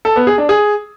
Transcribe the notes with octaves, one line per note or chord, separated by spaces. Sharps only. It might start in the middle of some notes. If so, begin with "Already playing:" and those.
A4
B3
G#4
D4
G#4